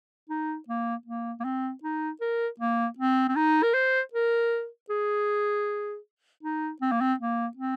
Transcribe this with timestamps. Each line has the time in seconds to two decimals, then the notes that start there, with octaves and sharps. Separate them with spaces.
0.30 D#4
0.68 A#3
1.06 A#3
1.40 A#3
1.45 C4
1.83 D#4
2.21 A#4
2.60 A#3
2.98 C4
3.29 C4
3.36 D#4
3.63 A#4
3.74 C5
4.14 A#4
4.90 G#4
6.43 D#4
6.82 C4
6.92 A#3
7.01 C4
7.20 A#3
7.57 C4